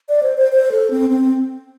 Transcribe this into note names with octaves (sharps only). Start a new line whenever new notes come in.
D5
C5
C5
C5
A4
C4
C4